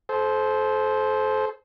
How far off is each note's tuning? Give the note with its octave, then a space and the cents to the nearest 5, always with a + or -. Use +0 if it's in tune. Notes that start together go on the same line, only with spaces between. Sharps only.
A4 -35 C5 +0